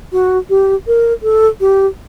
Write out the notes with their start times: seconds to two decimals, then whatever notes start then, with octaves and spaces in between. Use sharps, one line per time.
0.12 F#4
0.50 G4
0.87 A#4
1.23 A4
1.61 G4